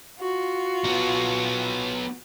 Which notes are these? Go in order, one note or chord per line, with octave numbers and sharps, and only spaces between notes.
F4 F#4
B3 D#4